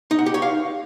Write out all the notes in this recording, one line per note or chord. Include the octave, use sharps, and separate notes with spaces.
D#4
F#5
G4
C#5
F5